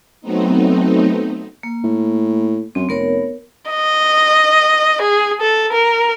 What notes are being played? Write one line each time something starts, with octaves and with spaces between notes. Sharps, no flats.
F#3 A3 B3 C4 D#4
A#3
A2
F#2 C4
F1 B3 A#4 C#5
D#5
G#4
A4
A#4